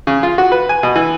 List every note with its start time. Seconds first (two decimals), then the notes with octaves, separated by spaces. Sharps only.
0.07 C#3
0.23 F4
0.38 F#4
0.52 B4
0.69 G#5
0.83 B2
0.95 E3